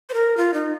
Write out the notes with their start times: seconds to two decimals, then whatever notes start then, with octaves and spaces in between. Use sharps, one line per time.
0.09 C5
0.14 A#4
0.37 F4
0.54 D#4